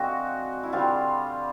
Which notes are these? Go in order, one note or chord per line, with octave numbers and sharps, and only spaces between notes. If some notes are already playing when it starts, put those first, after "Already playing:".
Already playing: D3 F3 G#3 C4 F#4
E4
D3 G3 C4 F4